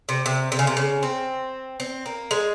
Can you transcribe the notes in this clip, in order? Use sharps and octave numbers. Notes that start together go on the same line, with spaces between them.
C3
C3
C3
C#3
C3
C#3
C4
C4
A#3
G#3